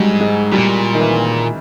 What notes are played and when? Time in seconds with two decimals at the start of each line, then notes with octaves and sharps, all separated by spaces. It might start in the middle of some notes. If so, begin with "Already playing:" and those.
Already playing: G#2 F#3 G3
0.20 G#3
0.52 A#2 G3
0.94 D#3
1.00 E3